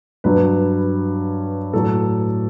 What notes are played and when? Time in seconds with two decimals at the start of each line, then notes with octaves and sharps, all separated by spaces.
0.24 G2 F#3 B4
1.73 A2 F#3 A4